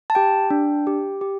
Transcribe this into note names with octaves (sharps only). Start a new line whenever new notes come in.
A5
G4 G5
D4
G4
G4